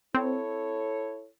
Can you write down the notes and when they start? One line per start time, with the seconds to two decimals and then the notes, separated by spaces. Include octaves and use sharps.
0.15 C4 E4 A4 C#5